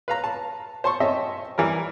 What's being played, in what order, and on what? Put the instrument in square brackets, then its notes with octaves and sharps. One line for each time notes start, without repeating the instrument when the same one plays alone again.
[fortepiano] B4 F5 A#5
A5
C5 A5 C6 C#6
C#4 D#5 E5 G5 A5
E3 G3 A#4